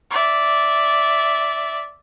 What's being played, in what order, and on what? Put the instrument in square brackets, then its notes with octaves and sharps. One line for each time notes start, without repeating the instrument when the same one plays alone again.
[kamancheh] D5 E5